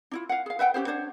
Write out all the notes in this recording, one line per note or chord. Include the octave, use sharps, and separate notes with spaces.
D4 E4 F4
F5 F#5
G#4 F5
B4 E5 F#5 G5
C#4 G4 G#4 C5
D4 C5 C#5